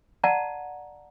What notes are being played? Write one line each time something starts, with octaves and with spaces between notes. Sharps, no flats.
D5 F#5 A5 A#5